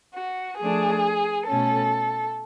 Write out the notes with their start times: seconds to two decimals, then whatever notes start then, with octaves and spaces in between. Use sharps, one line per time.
0.14 F#4
0.58 F3 A3 D4 G#4
1.47 B2 A3 C#4 A4